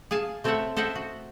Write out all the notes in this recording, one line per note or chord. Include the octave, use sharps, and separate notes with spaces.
G#4 F5 G#5 A5
A3 C4 A4 C#5 E5 F#5
A4 C5 D#5 E5 F#5 G5
F#4